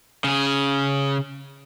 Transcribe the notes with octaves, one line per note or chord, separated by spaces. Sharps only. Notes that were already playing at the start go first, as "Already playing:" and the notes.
C#3 G#4